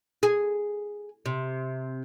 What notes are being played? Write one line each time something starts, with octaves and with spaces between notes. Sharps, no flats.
G#4
C3